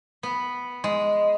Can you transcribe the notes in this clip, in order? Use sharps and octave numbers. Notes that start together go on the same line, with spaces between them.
B3
G#3